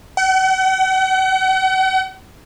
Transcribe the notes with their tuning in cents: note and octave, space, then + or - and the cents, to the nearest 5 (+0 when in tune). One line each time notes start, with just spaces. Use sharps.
F#5 +40